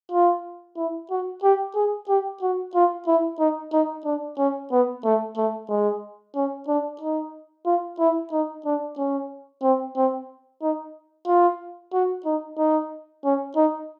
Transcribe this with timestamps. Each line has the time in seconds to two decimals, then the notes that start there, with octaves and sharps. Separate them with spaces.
0.12 F4
0.77 E4
1.11 F#4
1.43 G4
1.75 G#4
2.09 G4
2.42 F#4
2.75 F4
3.07 E4
3.39 D#4
3.73 D#4
4.05 D4
4.38 C#4
4.72 B3
5.05 A3
5.37 A3
5.69 G#3
6.36 C#4
6.68 D4
7.01 D#4
7.66 F4
7.99 E4
8.32 D#4
8.65 D4
8.98 C#4
9.63 C4
9.96 C4
10.62 D#4
11.27 F4
11.93 F#4
12.26 D#4
12.58 D#4
13.25 C#4
13.56 D#4